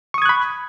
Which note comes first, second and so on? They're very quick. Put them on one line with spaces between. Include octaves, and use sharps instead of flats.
C#6 D#6 G#6 F#6 B5